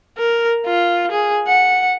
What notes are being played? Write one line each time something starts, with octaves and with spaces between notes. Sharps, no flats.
A#4
F4
G#4
F#5